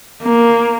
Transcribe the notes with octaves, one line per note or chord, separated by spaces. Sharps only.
A#3